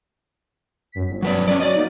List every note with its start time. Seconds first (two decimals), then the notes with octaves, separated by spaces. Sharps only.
0.92 F#2 B6
1.08 G1
1.22 F#3 B4 D5
1.48 C#4 B4 D5
1.60 F#3 D5 D#5 A6
1.75 F#3 A#3 D#4